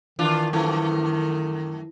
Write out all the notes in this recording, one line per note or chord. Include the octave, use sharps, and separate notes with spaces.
D#3 E3 D4 F4 F5
F#2 E3 F3 A3 E4